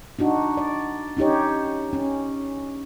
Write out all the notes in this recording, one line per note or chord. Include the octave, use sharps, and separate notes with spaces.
D4 D#4 F#4
D5
C#4 D#4 G4 C#5
C#4